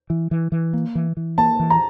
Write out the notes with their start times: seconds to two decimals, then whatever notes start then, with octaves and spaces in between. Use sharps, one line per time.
0.10 E3
0.31 E3
0.52 E3
0.73 A#3
0.95 E3
1.17 E3
1.38 A#3 A5
1.60 E3
1.70 A#5